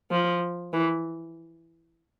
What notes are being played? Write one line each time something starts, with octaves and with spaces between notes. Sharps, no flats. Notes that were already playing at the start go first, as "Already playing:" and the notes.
F3
E3